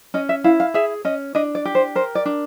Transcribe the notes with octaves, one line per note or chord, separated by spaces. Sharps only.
C#4 D#5
E5
E4 F5
F5
G#4 E5
C#4 D#5
D4 D#5
D5
G4
C5
A#4 C5
D5
D4